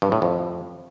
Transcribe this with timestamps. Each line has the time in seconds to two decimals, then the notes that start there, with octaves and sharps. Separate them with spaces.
0.02 G2
0.12 A2
0.22 F2